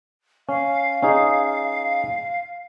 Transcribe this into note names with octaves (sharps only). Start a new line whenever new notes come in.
C#4 F5
C#4 D#4 G#4